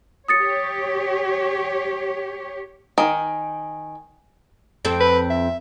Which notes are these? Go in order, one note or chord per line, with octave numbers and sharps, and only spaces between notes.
G4 C#5 D#6 A6 C#7
D#3 G#5
F2 C4 A4
B4
E5